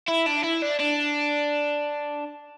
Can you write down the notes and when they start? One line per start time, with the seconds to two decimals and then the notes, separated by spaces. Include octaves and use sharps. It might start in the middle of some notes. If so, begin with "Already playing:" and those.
0.08 E4
0.27 D4
0.44 E4
0.62 D4
0.80 D4